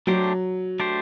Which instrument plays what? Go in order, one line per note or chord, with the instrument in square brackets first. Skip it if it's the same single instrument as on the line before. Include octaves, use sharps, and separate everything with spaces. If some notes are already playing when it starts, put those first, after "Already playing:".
[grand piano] F#3 [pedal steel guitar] A3 D4 G4 C5
[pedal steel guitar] A3 D4 G4 C5